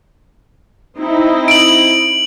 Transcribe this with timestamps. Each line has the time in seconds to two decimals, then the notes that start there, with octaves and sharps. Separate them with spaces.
0.98 C4 D#4 E4
1.48 D7 F#7